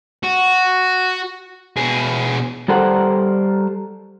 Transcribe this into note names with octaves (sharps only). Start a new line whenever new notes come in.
F#4
B2 G#4
G3 G4 A4 A#4 C5 F#5